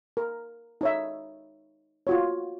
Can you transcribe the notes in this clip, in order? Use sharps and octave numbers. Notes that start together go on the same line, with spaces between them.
A#4
D#4 C#5 E5
F4 F#4 C#5